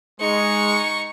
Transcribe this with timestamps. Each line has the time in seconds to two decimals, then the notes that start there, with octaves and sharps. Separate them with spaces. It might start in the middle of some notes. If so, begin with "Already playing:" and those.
0.20 G#3 D#4 C#6